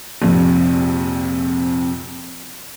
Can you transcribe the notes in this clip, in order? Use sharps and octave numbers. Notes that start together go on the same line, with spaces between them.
A#1 F2 C3